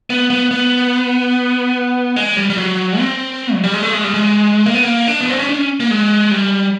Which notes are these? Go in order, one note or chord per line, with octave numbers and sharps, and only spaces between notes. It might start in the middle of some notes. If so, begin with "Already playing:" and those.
B3
B3
B3
G#3
G3
G3
F#3
C4
F#3
G3
G#3
A3
G#3
G3
G#3
A#3
B3
A#3
D4
B3
C4
C#4
D4
C#4
A#3
G#3
G3